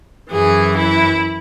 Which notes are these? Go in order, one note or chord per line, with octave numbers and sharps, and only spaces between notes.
F#2 E3 G#4
E4